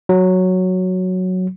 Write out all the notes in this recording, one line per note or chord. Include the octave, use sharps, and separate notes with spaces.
F#3